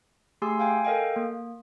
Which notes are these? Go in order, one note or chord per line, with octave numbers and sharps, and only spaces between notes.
A3 G4 G#4 G#5 C6 E6
F5 G5 G#5
A4 A#4 D#5 F5 G5
A#3